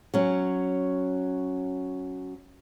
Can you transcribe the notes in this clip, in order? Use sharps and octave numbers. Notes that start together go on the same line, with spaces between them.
F#3 C#4